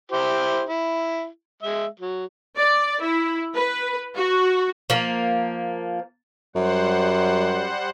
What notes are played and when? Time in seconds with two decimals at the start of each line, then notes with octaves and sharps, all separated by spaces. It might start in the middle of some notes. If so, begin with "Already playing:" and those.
0.12 E4 G4 C5
0.69 E4
1.63 G#3 E5
2.00 F#3
2.56 D5
3.01 E4
3.55 B4
4.15 F#4
4.90 F3 A#3
6.56 F#2 G3 C5 F#5